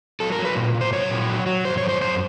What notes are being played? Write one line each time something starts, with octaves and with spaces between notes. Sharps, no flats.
F#3 A4
A#4
F#3
B4
A#2
A#2
C5
F#3 C#5
A#2
F#3
F#3
F#2 C5
C#5
F#2
C5
F#2 C5